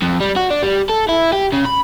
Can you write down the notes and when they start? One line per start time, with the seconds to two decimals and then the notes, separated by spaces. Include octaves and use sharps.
0.02 F2
0.20 G3
0.36 F#4
0.50 D4
0.62 G3
0.89 A4
1.09 E4
1.33 G4
1.53 C#3
1.65 B5